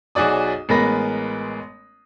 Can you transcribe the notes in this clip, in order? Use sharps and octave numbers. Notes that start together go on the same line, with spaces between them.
B1 F#3 F#4 G#4 D5 D#6
A1 G#3 B3 A#4 B5 A#6